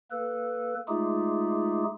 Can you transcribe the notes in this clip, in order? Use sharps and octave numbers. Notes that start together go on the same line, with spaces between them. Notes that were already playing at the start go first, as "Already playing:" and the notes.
A#3 A4 B4
G#3 A3 D#4 F4 G4 G#4